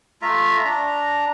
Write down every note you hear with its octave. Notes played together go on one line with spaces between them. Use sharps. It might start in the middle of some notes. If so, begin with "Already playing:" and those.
A3 F4 E5 A#5
D4 A#5